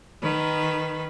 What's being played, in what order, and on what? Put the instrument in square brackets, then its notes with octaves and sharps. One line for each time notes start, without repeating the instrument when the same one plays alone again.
[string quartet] D#3 B4